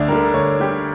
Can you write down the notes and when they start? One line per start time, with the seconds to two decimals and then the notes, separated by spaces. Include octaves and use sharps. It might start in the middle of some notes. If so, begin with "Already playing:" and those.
Already playing: D2 D4
0.08 D3 G3 A#4
0.34 D2 C#5
0.60 D3 G3 G4